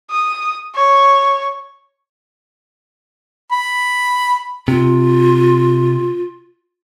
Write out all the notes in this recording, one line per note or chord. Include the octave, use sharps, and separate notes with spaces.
D#6
C#5
B5
C3 F4